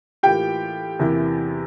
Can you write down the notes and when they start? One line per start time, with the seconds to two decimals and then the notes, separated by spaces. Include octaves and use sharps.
0.23 A2 E3 A#3 F4 G4 G5
0.99 E2 C3 E3 A#3 E4